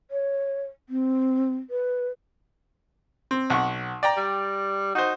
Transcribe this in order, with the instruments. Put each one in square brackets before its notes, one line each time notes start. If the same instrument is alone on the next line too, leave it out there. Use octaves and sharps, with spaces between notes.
[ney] C#5
C4
B4
[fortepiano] C4
B1 F#5 C#6
D5 G5 A#5
[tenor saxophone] G3
[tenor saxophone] D#4 [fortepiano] F#4 C5